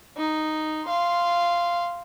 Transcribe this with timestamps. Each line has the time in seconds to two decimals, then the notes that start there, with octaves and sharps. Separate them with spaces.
0.17 D#4
0.85 F5 C6